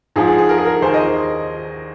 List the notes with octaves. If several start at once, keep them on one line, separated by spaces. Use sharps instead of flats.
G#2 F3 G#4
G#4
G#4
A#4
G#4
A#4
D#2 D#3 G#4 C5
A#4 D#5